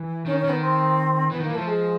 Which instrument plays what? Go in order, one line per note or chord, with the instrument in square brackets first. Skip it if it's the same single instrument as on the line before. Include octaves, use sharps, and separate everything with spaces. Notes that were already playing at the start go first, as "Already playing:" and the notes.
Already playing: [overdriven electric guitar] E3
[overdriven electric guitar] D#3 [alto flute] C#4
[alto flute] C#4
[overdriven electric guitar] D#3
[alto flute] B3
C4
[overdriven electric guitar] E3 [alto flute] B3
[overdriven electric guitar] D#3 [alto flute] A#3
[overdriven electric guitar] E3
[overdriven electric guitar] F3 [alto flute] A3
[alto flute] G#3